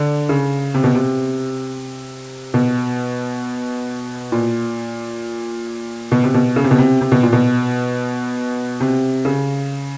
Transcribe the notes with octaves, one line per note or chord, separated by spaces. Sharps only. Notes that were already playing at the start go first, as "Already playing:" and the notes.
Already playing: D3
C#3
C3
B2
C3
B2
A#2
B2
C3
B2
C#3
C3
B2
C3
C3
B2
A#2
B2
C3
C#3